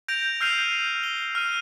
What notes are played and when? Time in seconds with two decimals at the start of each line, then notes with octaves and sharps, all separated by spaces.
0.08 G6 A#6 D7 F7
0.40 E6 F6 G6 C7 D#7 F7
1.03 G7
1.35 F6 D#7